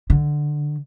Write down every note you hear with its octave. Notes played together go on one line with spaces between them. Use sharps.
D3